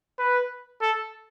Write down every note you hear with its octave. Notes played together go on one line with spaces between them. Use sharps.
B4
A4